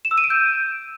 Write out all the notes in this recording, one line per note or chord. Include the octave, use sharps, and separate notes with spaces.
E7
E6
D#7
D7
G6